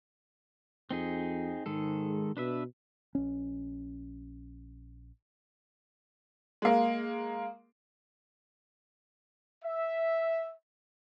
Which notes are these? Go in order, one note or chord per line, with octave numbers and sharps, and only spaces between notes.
F2 C4 D#4 G#4
G#2 D#3 G#3 A4
B2 D4 B4 E5
A#1 C#4
G#3 A#3
E5